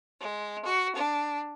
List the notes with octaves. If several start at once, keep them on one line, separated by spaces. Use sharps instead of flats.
G#3
F#4
D4